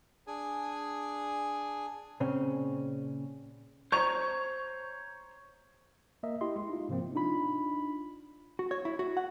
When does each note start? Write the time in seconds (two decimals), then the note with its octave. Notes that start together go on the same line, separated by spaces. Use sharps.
0.27 D4 G#4 G#5
2.20 A#2 C#3 C4 C#4
3.92 C5 C#5 A#5 C#6
6.23 A#3 A#4 D#5 E5
6.41 E4 G4 D#5 C6
6.56 G#3
6.70 D#4 F4
6.89 G#2 C3 F3 A#3 C4
7.15 D4 D#4 F4 B5
8.59 F#4
8.71 C#5
8.85 E4
8.99 F#4
9.17 F#5